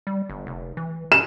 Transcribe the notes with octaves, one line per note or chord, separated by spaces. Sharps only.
G3
G1
F1
E3
C#4 E7